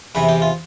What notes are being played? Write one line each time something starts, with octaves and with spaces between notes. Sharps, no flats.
E2 C3 E3 B4
G4
F4